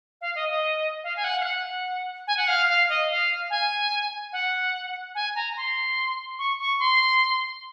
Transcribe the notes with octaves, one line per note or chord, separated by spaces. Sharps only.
F5
D#5
D#5
F5
G#5
F#5
F5
F#5
G#5
F#5
F5
F5
D#5
F5
G#5
F#5
G#5
A#5
C6
C#6
C#6
C6